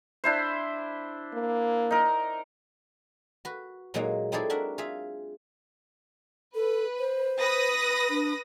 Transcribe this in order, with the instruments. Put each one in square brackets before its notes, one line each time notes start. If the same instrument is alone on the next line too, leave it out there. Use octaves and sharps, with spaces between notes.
[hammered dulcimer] D4 E4 C5
[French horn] A#3
[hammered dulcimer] D#4 A#4
[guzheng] F#4 B4
A#2 F#3 G#3 A#3 D#4
C4 D#4 E4 G#4 A4 D5
D4 F#4 A#4 E5
F4 G#4 E5
[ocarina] A4 [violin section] B4
[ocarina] C5
[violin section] B4 D#6 A#6
[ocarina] D4